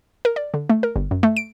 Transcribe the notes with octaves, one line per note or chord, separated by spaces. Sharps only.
A#4
D5
D3
A3
A#4
G1
F#2
A3
D7